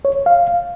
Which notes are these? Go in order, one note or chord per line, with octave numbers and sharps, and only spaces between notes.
C#5
F5